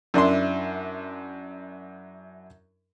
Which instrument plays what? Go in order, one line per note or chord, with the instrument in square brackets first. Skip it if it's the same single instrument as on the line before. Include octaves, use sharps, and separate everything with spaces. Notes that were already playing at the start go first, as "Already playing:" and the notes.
[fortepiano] F#2 D4 E4 C6